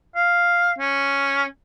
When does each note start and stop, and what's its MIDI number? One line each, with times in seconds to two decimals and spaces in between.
0.16 0.73 77
0.79 1.45 61